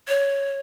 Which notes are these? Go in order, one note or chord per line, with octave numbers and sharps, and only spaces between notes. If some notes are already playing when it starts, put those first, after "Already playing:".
C#5